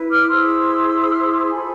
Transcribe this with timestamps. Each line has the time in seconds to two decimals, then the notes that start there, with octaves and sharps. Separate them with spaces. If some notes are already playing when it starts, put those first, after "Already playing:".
Already playing: E4 B4
0.10 D6 F6
0.30 E4 G#4 C5 C6 E6
1.11 F6
1.21 E6
1.31 D6
1.42 C6
1.52 F4 A4 C5 G#5 B5